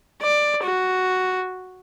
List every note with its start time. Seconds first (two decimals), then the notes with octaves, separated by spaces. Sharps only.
0.22 D5
0.64 F#4